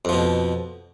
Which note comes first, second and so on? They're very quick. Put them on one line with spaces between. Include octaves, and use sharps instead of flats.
F2 F3 B2